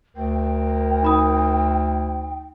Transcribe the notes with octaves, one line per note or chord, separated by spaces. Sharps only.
D2 A#4 G5
D#4 B5 D#6